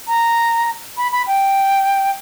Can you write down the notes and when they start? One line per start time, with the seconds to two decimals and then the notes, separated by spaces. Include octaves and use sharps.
0.08 A#5
0.97 B5
1.12 B5
1.27 G5